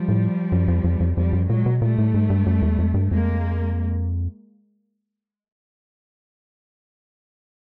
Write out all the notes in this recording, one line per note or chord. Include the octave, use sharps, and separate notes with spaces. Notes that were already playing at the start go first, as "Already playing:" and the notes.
Already playing: F3 G3
A2
F#2
F2
F2
F2
F2 F3 G3
F#2
A#2 F#3 G#3
B2
A#2 G3 A3
A2
G#2
G2
F#2
E2
F2
G2
F2 G#3 A#3